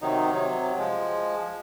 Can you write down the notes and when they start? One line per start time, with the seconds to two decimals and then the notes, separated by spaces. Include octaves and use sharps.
0.02 C3 D#3 F#3 D#4
0.34 C3 F#3
0.78 F3 G#3